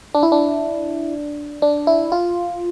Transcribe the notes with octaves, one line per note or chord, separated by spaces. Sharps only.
D4
E4
D4
D4
E4
F4